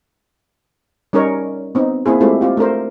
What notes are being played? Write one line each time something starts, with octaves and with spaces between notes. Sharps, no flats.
G3 C#4 D#4 A#4 C#5
B3 C4 D#4
A#3 C4 E4 G#4
G#3 A3 C4 E4 F4 G4
C4 F4 G4
A3 D4 A#4 C5